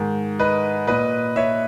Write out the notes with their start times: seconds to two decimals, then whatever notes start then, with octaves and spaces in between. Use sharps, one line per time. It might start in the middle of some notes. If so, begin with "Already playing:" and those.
Already playing: G#2 D#3
0.39 B4 D#5
0.87 A#2 B4 D#5
1.36 C#5 E5